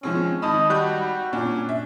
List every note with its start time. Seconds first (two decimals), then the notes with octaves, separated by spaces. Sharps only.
0.03 F3 G#3 C4 C#4
0.42 G#1 D#5 A5 B5
0.70 G3 F#4 F#6 G6
1.33 A#2 C#4 D4
1.69 E5